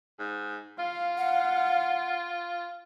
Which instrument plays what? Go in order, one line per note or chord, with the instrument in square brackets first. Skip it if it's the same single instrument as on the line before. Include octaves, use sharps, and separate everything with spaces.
[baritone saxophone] G#2
[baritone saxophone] F4 [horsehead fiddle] F5
[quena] F#5